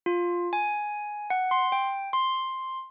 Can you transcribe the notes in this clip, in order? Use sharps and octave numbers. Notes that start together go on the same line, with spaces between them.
F4
G#5
F#5
C6
G5
C6